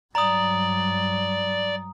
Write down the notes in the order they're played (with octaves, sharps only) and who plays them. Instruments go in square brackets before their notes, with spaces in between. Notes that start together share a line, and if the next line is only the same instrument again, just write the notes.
[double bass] G2 F#3 [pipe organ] D5 [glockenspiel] A#5 D#6